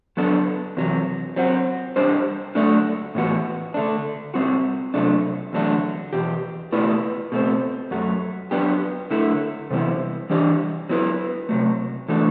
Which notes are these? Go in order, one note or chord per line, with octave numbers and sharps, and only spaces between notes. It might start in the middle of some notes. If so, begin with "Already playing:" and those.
F#3 B3 D4 A4
E2 C3 F#3
F#3 C4 F#4
G3 D4 G4 C5
F#3 A3 D4 A4 D5
A2 E3 B3 F#4
D3 A3 D4
G3 C4 F#4
C3 F#3 A3 D4
E2 D3 F#3 A3 D4
E2 B2 G4
B2 A3 E4 B4 D5
B2 A3 C4
F#2 F#3 A3
F#3 B3 D4 G4
D3 A3 E4
C3 E3 G3 B3 E4
E3 G3 D4 G4 D5
F#3 B3 E4 B4
C3 F#3 A3
E3 A3 D4 F#4